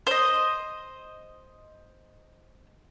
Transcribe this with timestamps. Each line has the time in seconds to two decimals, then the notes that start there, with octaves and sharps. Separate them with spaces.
0.07 C5 D#5